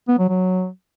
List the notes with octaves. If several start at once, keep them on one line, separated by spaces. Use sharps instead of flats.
B3
F#3
F#3